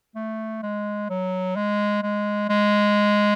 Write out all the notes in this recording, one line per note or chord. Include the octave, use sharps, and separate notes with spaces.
A3
G#3
F#3
G#3
G#3
G#3